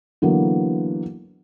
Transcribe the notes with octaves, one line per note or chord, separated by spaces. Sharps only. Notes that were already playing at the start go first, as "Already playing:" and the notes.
D3 E3 F#3 A#3 B3